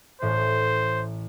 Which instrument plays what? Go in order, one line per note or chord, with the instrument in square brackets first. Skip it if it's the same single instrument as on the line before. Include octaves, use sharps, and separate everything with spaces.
[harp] A1 A2 [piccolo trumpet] C5